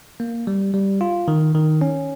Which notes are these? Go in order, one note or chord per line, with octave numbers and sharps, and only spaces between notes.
A#3
G3
G3
F4
D#3
D#3
C#4